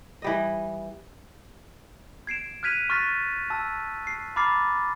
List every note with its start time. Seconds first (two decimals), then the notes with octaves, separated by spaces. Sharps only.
0.22 E3 G3 D#5
2.27 G#6 C7 D7 E7
2.63 F6 F#6 G#6 B6 D#7 F7
2.90 C#6 F6 F#6 A6 B6
3.50 A5 E6
4.07 C7
4.36 A#5 B5 D6 F6 A6 C7